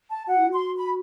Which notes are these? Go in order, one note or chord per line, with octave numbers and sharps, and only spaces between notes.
A5
F#4 F#5
E4
F#4 C6
B5